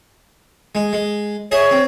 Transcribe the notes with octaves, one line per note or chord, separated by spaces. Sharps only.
G#3
G#3
G#4 C#5 D#5 E5
C4